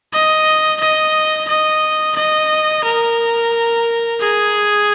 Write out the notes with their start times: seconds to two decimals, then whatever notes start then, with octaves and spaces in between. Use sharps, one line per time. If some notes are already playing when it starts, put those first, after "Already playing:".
0.13 D#5
0.80 D#5
1.49 D#5
2.16 D#5
2.84 A#4
4.20 G#4